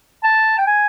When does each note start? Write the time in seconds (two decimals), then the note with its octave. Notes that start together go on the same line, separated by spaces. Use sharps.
0.24 A5
0.58 G5
0.67 G#5